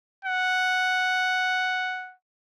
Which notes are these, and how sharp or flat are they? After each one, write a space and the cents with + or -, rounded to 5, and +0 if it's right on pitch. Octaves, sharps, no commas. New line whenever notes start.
F#5 +0